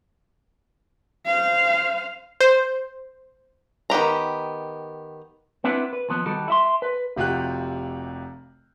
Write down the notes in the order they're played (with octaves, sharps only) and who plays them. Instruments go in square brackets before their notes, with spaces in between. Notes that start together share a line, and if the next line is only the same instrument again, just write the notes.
[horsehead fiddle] C5 F5
[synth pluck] C5
[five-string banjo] D#3 B3 G4 A#5
[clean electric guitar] B3 C4 D4 E4 B4
B4
D#2 F3 B3
D#3 G3 F#4 A4
E4 E5 C6
B4
[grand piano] F1 C3 F4 F#4 G5 F#6